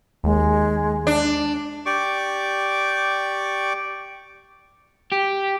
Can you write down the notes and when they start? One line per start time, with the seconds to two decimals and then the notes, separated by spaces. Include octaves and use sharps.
0.24 D#2 G#3
1.07 D4
1.86 G4 D5 C#6 D6
5.12 G4